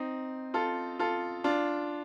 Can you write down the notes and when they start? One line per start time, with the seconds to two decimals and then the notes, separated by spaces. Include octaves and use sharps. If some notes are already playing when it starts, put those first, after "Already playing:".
Already playing: C4 D#4
0.54 F4 A4
0.99 F4 A4
1.44 D4 F4